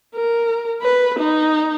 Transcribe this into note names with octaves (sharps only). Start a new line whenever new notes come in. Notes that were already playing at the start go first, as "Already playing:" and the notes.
A#4
B4
D#4